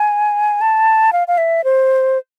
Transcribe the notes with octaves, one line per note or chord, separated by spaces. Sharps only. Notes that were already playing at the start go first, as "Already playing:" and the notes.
Already playing: G#5
A5
F5
F5
E5
C5